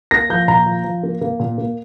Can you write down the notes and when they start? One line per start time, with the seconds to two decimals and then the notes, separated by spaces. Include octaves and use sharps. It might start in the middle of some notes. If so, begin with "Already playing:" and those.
0.11 A#3 A#6
0.30 F3 G6
0.48 A#2 A#5
0.66 F3
0.84 F3
1.03 A#3
1.21 A#3
1.40 A#2
1.58 A#3